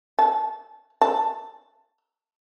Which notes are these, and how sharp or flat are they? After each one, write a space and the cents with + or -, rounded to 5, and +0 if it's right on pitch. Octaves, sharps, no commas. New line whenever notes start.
A5 -15
A5 +10